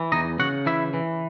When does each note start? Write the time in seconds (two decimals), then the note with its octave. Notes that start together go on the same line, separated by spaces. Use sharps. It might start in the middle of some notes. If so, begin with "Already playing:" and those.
Already playing: E3
0.12 E2 D#4 D#5
0.39 C#3 F#4 F#5
0.66 E3 E4 E5
0.94 E3